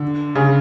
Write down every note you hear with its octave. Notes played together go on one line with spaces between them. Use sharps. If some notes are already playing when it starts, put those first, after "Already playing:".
Already playing: D3
C#3